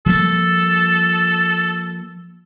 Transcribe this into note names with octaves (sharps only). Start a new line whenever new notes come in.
F3 G3 A#3 A4